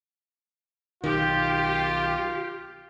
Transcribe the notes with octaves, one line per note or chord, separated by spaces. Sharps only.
B1 D#3 F4 G4